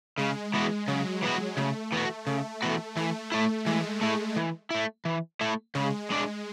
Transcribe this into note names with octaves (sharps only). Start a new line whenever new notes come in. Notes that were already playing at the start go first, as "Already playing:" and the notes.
C#3 G#3
E3 B3 F#4
C#3 F#3
E3 B3 F#4
C#3 A3
E3 B3 F#4
C#3 A3
E3 B3 F#4
E3 A3
A3 E4
E3 G#3
A3 E4
E3
A3 E4
E3
A3 E4
C#3 G#3
G#3 D4